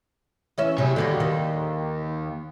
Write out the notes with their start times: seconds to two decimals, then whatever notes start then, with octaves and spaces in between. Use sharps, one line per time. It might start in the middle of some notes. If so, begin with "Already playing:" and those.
0.58 E3 C#4 E5
0.78 C3 F#3 G3 G#4
0.96 D#2 D3 G3 F#4
1.20 D#3